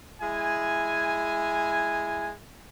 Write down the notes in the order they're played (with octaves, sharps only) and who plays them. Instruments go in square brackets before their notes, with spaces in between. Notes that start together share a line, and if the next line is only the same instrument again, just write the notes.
[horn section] G#3 E4 G#5